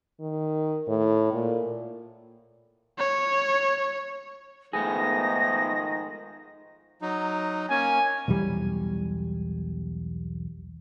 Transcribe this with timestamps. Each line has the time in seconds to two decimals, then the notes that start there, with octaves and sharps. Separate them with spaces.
0.20 D#3
0.88 A2
1.33 A#2
2.99 C#5
4.73 G#2 D#3 F3 A3 B3 G#4 A#6
7.02 F#3 D#4
7.70 A#3 C#4 G#5
8.28 B1 E2 G3